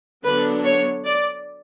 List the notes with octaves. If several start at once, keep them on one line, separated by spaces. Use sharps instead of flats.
D3 F#3 B3 D4 B4
C#5
D5